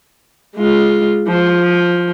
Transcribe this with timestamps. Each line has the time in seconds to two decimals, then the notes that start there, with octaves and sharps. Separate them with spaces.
0.56 G#3 F4
1.28 F3